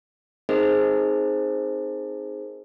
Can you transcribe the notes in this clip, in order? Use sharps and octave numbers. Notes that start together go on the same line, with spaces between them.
C4 D#4 G#4 A#4 C5 D#5